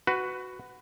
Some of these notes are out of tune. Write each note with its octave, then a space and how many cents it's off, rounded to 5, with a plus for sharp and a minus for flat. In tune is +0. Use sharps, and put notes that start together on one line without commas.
F#4 +0 B4 +15